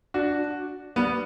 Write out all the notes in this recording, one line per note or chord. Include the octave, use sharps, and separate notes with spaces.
D4 F#4
G3 B3